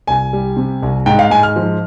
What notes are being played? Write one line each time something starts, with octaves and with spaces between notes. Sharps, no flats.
C2 G#5
G3
C3
C2
G#2 G5
F5
G#2 G#5
F6
F3